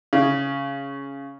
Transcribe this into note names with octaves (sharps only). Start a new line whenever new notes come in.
C#3